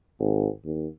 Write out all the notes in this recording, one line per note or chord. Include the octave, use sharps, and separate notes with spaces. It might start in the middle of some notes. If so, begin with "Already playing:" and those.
G#1
D#2